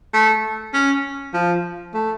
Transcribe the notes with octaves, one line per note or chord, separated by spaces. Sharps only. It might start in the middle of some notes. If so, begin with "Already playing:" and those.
A3
C#4
F3
A3